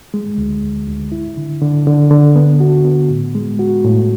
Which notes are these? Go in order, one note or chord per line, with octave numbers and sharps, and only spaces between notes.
G#3
D2
D2
D2
E4
D3
D3
D3
D3
B3
F#4
B3
A2
G#3
F#4
A2